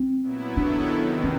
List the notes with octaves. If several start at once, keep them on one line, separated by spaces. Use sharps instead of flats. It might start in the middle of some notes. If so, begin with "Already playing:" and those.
Already playing: C4
A#2 F#3 B3 E4
D#3 F#3 B3 D4 E4 A4
E2 C3 D#3
C#4